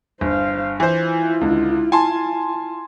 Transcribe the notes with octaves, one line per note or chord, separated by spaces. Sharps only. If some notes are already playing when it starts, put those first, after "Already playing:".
G1 C5 F5
E3 E4 F4 C5
C#2 D3
G#5 A5 C6